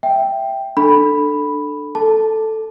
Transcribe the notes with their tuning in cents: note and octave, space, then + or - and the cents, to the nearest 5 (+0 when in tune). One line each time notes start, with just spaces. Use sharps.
E5 +0 G5 +0
D4 +20 A4 +0 B5 +0
A4 +0 A5 +0